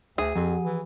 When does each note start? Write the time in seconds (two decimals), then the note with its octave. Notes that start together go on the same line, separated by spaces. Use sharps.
0.18 D2 G#4
0.35 F2 F3
0.65 E3